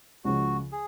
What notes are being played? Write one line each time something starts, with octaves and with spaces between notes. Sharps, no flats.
C#2 C#3 F3 G#3 F#4
G#4